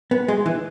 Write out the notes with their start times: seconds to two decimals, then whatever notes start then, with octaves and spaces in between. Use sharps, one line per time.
0.11 B3
0.28 G#3
0.46 E3